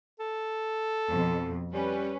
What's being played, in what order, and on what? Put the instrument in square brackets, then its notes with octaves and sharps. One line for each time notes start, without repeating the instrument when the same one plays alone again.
[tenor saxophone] A4
[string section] F2 B2
[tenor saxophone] G3 [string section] C#4 B4